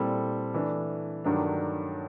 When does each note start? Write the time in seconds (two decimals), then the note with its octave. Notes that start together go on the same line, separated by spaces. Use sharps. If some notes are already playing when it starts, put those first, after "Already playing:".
Already playing: A#2 G3 C4 E4 A4
0.54 E3 A3 D4
1.24 G2 D#3 F#3 A3 D4